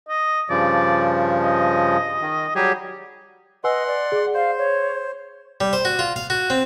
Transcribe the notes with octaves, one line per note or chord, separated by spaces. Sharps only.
D#5
G2 C#3 F3 D5
D#5
D#3
F#3 G3 G4 G#4
B4 D#5 F#5 G#5 C6 E6
D5
G#4
C5 F5
C#5
G3
C5
F#4
F4
F5
F#4
C4